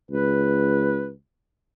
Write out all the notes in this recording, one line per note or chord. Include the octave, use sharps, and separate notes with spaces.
C#2 B4